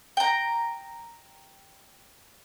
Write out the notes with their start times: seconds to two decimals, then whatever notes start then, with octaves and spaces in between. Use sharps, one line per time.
0.17 G5 A#5